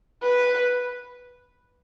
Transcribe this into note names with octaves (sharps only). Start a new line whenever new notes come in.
B4